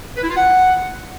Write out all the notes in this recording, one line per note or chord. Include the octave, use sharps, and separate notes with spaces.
B4
E4
F4
F#5